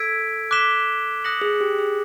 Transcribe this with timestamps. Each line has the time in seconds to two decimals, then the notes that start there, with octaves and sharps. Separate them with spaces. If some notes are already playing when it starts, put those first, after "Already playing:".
Already playing: A4 E6 G#6 B6 D7
0.51 D6 F#6 B6 E7 G7
1.24 D#6 F#6 A#6 C#7 F#7
1.41 G#4
1.61 G4
1.79 G#4